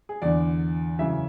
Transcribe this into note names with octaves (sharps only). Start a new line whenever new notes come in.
G#4
E2 D3 D5
F#2 C#3 E3 E5